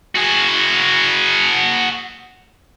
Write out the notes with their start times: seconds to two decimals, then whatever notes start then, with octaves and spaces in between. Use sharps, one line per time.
0.16 F#4 G#4